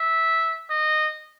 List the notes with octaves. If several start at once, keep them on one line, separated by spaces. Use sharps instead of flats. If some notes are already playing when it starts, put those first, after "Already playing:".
Already playing: E5
D#5